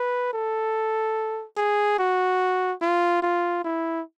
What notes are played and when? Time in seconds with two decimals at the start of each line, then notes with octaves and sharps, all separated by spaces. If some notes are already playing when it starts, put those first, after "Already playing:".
Already playing: B4
0.33 A4
1.57 G#4
1.99 F#4
2.82 F4
3.23 F4
3.64 E4